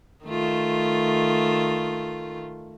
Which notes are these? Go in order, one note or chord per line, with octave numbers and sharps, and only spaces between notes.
D#3 A3 F4